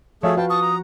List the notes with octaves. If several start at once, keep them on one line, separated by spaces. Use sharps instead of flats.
F3 A3 F#4 G#4 A4 C#5 E5 F5
F#4 B4 F5 G5 A5 B5
A5 C#6 D#6
A#5